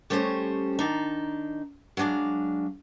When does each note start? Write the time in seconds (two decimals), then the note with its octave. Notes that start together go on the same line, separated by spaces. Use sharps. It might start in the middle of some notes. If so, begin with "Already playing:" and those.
0.10 G3 A3 C#4 G4 C5 C#5
0.79 D#3 D4 D#4
1.97 F#3 G#3 C#4 D4 F5